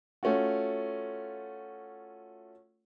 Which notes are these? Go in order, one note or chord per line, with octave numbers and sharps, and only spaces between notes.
A3 C#4 F4 F#4